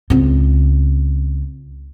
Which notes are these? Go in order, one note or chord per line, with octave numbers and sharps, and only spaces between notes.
C#2 C4